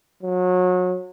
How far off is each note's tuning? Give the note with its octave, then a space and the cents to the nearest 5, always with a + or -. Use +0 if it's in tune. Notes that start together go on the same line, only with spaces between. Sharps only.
F#3 -30